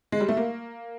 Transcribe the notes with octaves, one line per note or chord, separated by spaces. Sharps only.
G#3
G3
A3
A#3